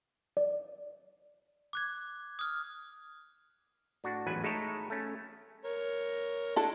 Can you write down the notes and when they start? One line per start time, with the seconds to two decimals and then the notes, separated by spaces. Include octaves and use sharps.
0.37 D5
1.73 D6 F#6 G#6
2.39 D#6 F6
4.04 A2 D4 F#4
4.27 A1 E2 G#2 F#3 B4 G#5
4.44 G#3 A3 D#4 E4 A4 C#5
4.90 A3 C#4
5.65 A#4 C#5
6.56 G#3 D4 E4 A4